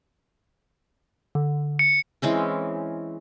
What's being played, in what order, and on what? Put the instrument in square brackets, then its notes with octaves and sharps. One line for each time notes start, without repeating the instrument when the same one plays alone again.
[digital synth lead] D3
[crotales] C#7
[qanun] E3 G#3 C4 C#4